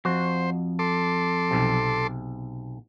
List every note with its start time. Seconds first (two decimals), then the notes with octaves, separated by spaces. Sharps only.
0.05 F2 F#4 C5
0.79 A4 C6 D6
1.51 B1 C3